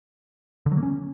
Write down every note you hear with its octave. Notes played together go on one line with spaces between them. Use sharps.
D3
F#3
A#3
C#4